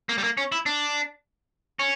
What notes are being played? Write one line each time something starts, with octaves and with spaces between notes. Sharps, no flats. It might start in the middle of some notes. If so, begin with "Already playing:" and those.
A#3
G3
A#3
C#4
E4
D4
C#4